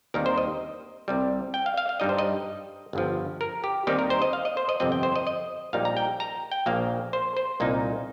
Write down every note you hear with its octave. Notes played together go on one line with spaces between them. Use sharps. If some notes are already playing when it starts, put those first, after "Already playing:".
D#2 D#3 G3 C4 D#4 A#4
C5
D#5
C2 C3 G3
G5
F5
F5
F5
G2 G3 D#4 D#5
C5
D#5
G1 G2 F3
A#4
G4
D#2 D#3 G3 C4 D#4 G4
A#4
C5
D#5
F5
D#5
C5
D#5
G1 F2 C3 F3 C4 D#5
G5
C5
D#5
D#5
A#1 A#2 G3 D#4 F5
A#5
G5
A#5
G5
A#1 A#2 A#3 F5
C5
C5
C2 A#2 A#3 D#4